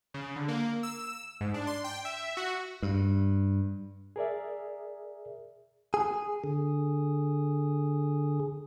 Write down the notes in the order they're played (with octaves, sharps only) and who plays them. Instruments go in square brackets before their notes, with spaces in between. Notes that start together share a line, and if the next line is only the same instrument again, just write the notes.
[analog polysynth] C#3
D3
A#3
E6
G#2
D4
C6
G5
E5
F#4
[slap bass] G2
[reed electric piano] G#4 A#4 D5 E5
[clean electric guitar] G#4
[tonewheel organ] D3 G#4